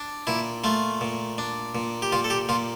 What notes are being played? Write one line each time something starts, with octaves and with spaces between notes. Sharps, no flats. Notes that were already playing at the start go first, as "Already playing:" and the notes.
Already playing: D4
A#2 E4
A3 F4
A#2
D4
A#2
G4
A#2 F4
A4
G4
A#2 F4